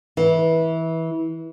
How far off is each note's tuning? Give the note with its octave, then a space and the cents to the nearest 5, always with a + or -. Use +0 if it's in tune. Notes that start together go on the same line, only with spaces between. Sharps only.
E3 -20